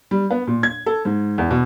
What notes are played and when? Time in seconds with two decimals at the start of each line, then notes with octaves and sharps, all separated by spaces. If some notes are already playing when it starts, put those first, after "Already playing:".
0.11 G3
0.31 B3
0.47 A#2
0.63 G#6
0.86 A4
1.05 G#2
1.38 E2
1.51 B2